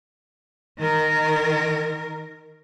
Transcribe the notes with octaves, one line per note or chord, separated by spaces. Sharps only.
D#3 A#4